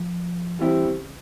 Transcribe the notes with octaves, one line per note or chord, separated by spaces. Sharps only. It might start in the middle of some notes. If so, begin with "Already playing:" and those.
Already playing: F3
E3 G3 C4 E4 G4
C#3